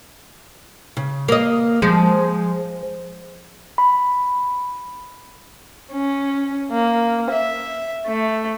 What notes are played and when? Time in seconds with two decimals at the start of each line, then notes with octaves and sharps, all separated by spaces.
0.97 C#3
1.28 A#3 D#5
1.82 F3 G#3
3.78 B5
5.92 C#4
6.71 A#3
7.30 E5
8.06 A3